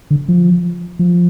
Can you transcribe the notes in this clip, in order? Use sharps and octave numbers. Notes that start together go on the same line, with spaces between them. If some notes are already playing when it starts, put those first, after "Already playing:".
D3
F3
F3